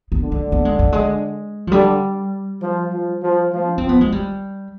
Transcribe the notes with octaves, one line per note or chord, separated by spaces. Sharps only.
B3
D3
G#3
B3
G#3
G3
G#3
F3
D3 G3
F3
F3
F3
F3
D4
F3 C4
B3
G#3
G3